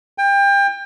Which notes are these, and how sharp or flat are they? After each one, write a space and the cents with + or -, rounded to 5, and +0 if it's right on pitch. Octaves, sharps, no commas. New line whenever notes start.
G5 +30